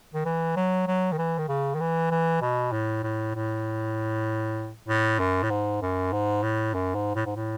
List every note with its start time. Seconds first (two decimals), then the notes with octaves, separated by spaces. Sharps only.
0.14 D#3
0.25 E3
0.56 F#3
0.87 F#3
1.12 D#3
1.18 E3
1.38 D#3
1.49 C#3
1.75 D#3
1.80 E3
2.11 E3
2.42 B2
2.72 A2
3.03 A2
3.35 A2
4.88 A2
5.19 F#2
5.43 A2
5.50 G#2
5.82 F#2
6.13 G#2
6.43 A2
6.74 F#2
6.95 G#2
7.15 A2
7.26 G#2
7.36 A2